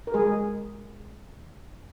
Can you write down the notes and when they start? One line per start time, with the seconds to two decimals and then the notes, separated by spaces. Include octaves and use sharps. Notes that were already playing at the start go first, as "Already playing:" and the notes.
0.07 A#4
0.14 G#3 G#4